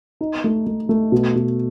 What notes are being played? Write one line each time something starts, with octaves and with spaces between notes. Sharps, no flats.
D#4
A3
A3
A3
B2
B2